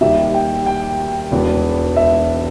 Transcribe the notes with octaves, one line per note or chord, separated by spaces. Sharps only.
D#2 D#3 G3 E5
G5
G5
E1 E2 B2 G#3 B3
E5